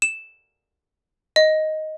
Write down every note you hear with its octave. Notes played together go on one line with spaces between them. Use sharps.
E7
D#5